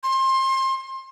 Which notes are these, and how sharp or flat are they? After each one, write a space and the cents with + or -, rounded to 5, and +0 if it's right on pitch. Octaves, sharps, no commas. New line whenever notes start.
C6 +25